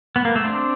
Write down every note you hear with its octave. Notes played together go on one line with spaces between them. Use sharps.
B3
A#3
A3
C4 D4